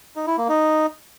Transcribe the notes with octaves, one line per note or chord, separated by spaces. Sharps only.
D#4
E4
A#3
D#4